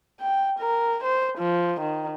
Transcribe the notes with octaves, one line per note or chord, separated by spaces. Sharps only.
G5
A#4
C5
F3
D#3